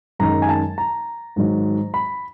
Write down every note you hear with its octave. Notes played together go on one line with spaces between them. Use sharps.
F#2 D#3 G#3 A#5
G#5
A5
A#5
G#2 D#3 F#3
B5